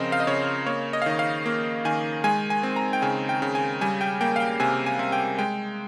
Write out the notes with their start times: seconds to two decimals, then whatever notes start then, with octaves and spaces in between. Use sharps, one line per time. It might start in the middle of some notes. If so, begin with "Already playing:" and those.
Already playing: C#3 F3 C4 A#4 C5 D#5
0.12 F5
0.20 D#5
0.27 C#3 C#5
0.67 A#3 C#5
0.93 D#5
1.02 F5
1.06 D#3 D#5
1.19 F5
1.46 A#3
1.85 D#3 G#5
2.24 G#3 G#5
2.50 G#5
2.63 C4
2.76 A#5
2.93 G5
3.02 C#3 G#5
3.29 G5
3.42 C#3
3.55 G#5
3.81 G3 G#5
4.01 G5
4.21 A#3 G5
4.36 F5
4.40 G5
4.60 C3 G#5
4.86 G#5
4.99 C3
5.12 G5
5.38 G#3 G5